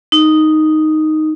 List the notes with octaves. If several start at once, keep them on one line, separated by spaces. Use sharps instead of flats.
D#4